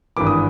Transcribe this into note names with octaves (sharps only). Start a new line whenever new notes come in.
G#1 G2 E3 D6
D#6